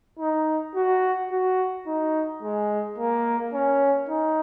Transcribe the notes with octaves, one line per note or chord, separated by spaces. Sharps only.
D#4
F#4
F#4
D#4
G#3
A#3
C#4
D#4